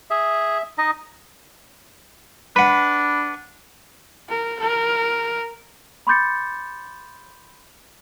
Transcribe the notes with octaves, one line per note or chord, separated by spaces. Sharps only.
G#4 E5
D#4 D#5
D4 B4 F#5 B5
A#4
A#4
B5 C6 D6 G6 A6 C#7